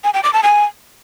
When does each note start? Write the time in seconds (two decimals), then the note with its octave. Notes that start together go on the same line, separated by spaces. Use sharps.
0.04 G#5
0.14 G5
0.23 D6
0.33 A5
0.43 G#5